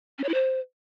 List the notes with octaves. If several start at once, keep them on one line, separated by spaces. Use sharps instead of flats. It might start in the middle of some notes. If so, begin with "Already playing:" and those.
C#4
C#5
E4
C5